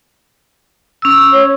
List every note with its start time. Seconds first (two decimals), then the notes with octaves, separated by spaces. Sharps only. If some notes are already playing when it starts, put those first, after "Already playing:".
1.02 C#4 E6
1.33 C#5